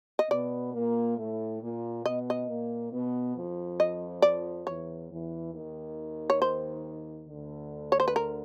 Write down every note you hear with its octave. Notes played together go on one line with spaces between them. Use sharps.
D#5
B2 B3 D5
A#2 A#3
A2 A3
A#2 A#3
B2 B3 D#5
D#5
A#2 A#3
B2 B3
F2 F3
D#5
D5
E2 E3 C#5
E2 E3
D#2 D#3
C#5
C5
D2 D3
C#5
C5
B4
A#4